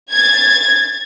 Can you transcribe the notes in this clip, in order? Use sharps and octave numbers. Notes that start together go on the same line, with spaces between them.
G#6 A6